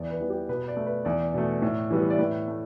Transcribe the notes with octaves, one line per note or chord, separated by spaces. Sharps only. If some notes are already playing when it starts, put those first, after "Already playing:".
Already playing: E2 D5
B4
E3 G3 B3
G4
B2 B4
D5
A3
B4
E2 D5
B2 A3
A2
E3 G3 B3
D5
A2 B4
A3